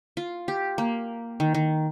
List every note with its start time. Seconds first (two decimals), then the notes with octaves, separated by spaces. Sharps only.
0.17 F4
0.48 G4
0.78 A#3
1.40 D#3
1.54 D#3